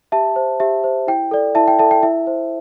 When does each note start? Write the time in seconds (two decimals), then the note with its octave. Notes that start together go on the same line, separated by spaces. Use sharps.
0.12 G4 E5 A5
0.36 C5
0.60 G4 E5
0.84 C5
1.07 E4 G5
1.31 A4 D5
1.55 E4 E5 A5
1.68 G5
1.79 A4 D5 E5 A5
1.91 G5
2.03 E4 E5
2.27 C5